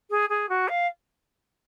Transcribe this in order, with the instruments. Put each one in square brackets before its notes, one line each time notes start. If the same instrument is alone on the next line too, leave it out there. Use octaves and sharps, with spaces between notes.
[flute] G#4
G#4
F#4
F5